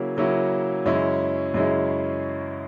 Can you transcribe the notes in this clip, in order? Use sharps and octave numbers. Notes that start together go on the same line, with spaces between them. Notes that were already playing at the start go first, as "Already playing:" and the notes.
Already playing: C#3 F#3 A#3 C#4 E4
C#3 F#3 A#3 C#4 E4
F#2 C#3 G#3 C#4 E4
F#2 C#3 G#3 C#4 E4